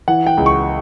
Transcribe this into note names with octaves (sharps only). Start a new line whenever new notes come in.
E3 F#5
G5
C#2
C#6